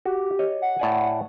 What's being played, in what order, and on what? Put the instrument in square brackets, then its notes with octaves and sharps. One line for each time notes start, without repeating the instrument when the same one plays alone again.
[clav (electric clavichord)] F#4 [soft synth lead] G4
[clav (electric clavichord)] C#5 D#5
[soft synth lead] F#5
[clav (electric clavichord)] A2 D5 G#5